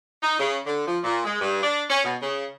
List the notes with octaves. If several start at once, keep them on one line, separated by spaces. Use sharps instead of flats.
D#4
C#3
D3
F3
A#2
G#3
G2
D4
C#4
B2
C#3